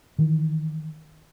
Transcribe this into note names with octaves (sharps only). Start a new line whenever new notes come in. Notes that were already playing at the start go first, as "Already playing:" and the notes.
D#3 E3